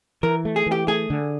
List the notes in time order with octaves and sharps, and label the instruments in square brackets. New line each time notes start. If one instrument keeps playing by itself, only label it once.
[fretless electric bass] E3 [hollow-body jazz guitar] A#4
[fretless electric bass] A3
[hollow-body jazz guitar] G#4
[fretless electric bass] E3
[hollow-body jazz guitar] G4
[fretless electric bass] A3 [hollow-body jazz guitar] G#4
[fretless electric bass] D3